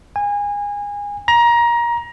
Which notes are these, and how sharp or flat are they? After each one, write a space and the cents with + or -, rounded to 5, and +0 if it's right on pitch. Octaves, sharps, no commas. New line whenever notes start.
G#5 -25
A#5 +20